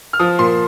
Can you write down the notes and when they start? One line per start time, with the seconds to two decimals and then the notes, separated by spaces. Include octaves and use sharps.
0.13 F6
0.19 F3 D#6
0.39 A#2 C6